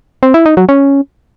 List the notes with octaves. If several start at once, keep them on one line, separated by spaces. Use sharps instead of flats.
C4
E4
D#4
F#3
C#4